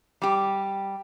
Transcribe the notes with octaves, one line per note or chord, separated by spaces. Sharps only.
G3 G4